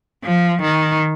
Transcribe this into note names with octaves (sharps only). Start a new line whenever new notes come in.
F3
D#3